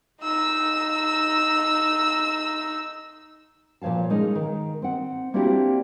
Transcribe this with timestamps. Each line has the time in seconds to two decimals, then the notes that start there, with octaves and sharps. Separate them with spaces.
0.22 D#4 E6
3.82 A#2 F3 C#5 F5 A5
4.10 G#3 C#4 D#4 A#4
4.35 D#3
4.82 C4 F#5
5.34 A#3 C4 D4 E4 F#4 G4